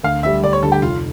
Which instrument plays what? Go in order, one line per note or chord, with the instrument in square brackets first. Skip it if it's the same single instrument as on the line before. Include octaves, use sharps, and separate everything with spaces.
[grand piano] D2 [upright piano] F5
[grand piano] D3 G3 [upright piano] E5
[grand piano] D2 [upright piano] D5
[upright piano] C#5
[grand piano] D3 [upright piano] A4
[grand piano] G3
[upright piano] G4
[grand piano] F1 [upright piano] F4